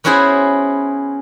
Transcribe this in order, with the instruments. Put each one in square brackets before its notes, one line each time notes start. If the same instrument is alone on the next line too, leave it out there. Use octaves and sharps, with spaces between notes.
[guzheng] B3 C#4 E4 F#4 G#4 C5